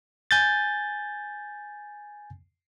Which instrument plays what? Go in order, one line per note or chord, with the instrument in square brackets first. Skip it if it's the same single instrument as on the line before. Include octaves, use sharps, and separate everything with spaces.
[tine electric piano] G#5 G6 A6